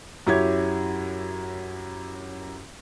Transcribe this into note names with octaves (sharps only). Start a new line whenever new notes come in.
F#2 E4 G4 C#5 G#6